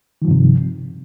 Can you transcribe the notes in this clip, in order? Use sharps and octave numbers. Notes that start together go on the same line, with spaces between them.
G2 C3 D#3 F3